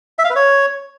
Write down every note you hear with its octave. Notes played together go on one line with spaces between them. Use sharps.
E5
F5
B4
C#5